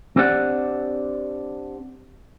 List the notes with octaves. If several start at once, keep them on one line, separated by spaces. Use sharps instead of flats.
C4 D4 G4 C5 D5 F#5